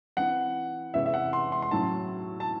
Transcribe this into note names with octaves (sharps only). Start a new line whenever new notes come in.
E3 C4 E4 F#5
E2 C3 E3 G#3 C#4 E5
E5
F#5
C6
C6
C6
A2 F#3 C#4 F#4 A5
A5